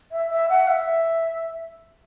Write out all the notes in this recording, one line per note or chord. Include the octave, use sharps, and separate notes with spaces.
E5
E5
F#5
E5